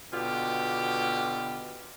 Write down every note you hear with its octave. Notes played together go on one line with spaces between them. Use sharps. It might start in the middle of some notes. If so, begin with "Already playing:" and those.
B2 D3 F4 G4